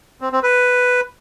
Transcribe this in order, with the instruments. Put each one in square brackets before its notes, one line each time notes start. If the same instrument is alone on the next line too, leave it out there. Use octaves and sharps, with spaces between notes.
[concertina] C4
C4
B4